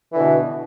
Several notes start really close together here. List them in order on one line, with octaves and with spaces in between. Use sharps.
E3 D3 B2